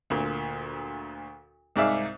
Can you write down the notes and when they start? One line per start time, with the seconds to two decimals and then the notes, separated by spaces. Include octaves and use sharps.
0.10 D2 A#2
1.76 C2 G#2 G#4 D5 E5 F5